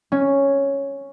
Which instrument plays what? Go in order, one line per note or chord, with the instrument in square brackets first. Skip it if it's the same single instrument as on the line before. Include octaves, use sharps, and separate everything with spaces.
[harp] C#4